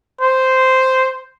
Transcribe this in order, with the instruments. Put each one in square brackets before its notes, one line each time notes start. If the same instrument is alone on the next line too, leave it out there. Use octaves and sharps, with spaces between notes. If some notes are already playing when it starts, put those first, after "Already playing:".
[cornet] C5